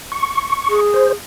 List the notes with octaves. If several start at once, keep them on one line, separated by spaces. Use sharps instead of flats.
C#6
G#4
C5